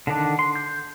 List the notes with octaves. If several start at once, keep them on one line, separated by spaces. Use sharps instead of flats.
D3 D#3 D4
C6
G6